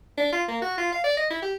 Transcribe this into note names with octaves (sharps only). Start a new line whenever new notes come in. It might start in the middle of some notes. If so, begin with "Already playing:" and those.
D4
F4
A#3
F#4
F4
F5
D5
D#5
E4
G4